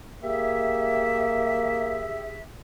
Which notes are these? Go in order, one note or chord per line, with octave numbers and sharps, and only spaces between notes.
A#3 G4 G#4 E5